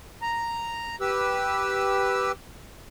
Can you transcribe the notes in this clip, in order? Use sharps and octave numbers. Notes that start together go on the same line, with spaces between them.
A#5
G4 B4 E6